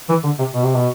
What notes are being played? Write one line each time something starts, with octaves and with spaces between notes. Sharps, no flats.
E3
D3
C3
B2
C3
B2